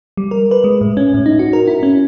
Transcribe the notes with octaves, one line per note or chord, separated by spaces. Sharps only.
G3
A#4
B4
G#3
A2
C#4
A2
D#4
F#4
A#4
E4
C#4